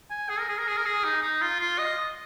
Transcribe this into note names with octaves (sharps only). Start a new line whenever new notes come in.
G#5
G#4
A#4
G#4
A#4
G#4
A#4
G#4
D#4
D#4
F4
F4
D#5